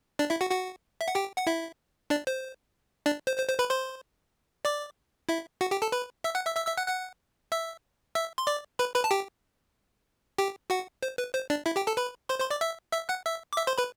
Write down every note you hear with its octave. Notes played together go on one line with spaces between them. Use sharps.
D4 D5
E4 E5
F#4 F#5
F#4 F#5
E5
F#5
G4 G5
F#5
E4 E5
D4 D5
C5
D4 D5
C5
C5
C5
B4 B5
C5 C6
D5 D6
E4 E5
F#4 F#5
G4 G5
A4 A5
B4 B5
E5 E6
F#5 F#6
E5 E6
E5 E6
E5 E6
F#5 F#6
F#5 F#6
E5 E6
E5 E6
C6
D5 D6
B4 B5
B4 B5
A5
G4 G5
G4 G5
F#4 F#5
C5
B4
C5
D4 D5
E4 E5
G4 G5
A4 A5
B4 B5
C5 C6
C5 C6
D5 D6
E5 E6
E5 E6
F#5 F#6
E5 E6
D6
E5 E6
C5 C6
B4 B5